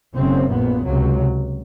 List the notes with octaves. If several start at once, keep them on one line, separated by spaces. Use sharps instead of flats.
F#1 F#2 C#3 C4
A#1 A#2 B3
C#2 C3 F#3